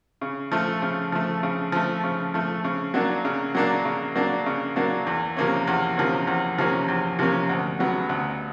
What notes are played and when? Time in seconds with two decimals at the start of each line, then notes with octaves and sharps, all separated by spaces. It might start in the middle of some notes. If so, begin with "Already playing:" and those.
0.21 C#3
0.52 F3 A3
0.82 C#3
1.12 F3 A3
1.43 C#3
1.72 F3 A3
2.03 C#3
2.34 F3 A3
2.64 C#3
2.94 F#3 A#3 D4
3.25 C#3
3.55 F#3 A#3 D4
3.85 C#3
4.15 F#3 A#3 D4
4.46 C#3
4.76 F#3 A#3 D4
5.07 E2
5.36 C3 F3 A#3 C#4
5.67 E2
5.97 C3 F3 A#3 C#4
6.27 E2
6.58 C3 F3 A#3 C#4
6.88 E2
7.19 C3 F3 A#3 C#4
7.49 D2
7.79 C#3 F#3 B3
8.09 D2